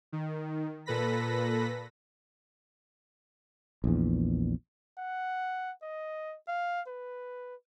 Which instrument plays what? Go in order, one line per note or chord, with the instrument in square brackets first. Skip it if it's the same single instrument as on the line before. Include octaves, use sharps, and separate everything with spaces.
[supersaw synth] D#3
A#2 A4 B4 B5 A#6 B6
[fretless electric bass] A#1 E2
[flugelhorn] F#5
D#5
F5
B4